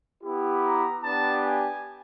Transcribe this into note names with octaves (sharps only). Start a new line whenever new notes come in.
B3 E4 G4
A#5
B3 D4 G4 A5
G#5